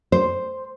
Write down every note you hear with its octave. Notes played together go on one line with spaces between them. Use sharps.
C5